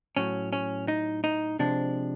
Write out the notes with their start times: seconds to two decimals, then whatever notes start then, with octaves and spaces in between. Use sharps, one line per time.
0.17 A2 F#3 C#4
0.53 C#4
0.88 D#4
1.24 D#4
1.59 C3 F3 G#3 D4